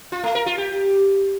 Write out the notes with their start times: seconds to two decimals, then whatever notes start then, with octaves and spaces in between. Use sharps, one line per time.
0.12 F4
0.23 A3
0.35 A#4
0.46 F4
0.58 G4